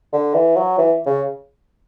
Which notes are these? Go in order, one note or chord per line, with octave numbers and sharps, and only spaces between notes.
D3
E3
F#3
E3
C#3